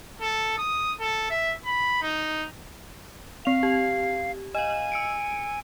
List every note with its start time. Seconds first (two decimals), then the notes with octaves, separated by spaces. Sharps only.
0.21 A4
0.58 D#6
1.00 A4
1.30 E5
1.65 B5
2.02 D#4
3.45 C4 F5 F7
3.63 G4
4.55 D#5 F5 G#5
4.92 E6 C#7 D7